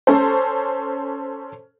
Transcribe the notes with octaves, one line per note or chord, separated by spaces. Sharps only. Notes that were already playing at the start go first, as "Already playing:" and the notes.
C#4 A4 C5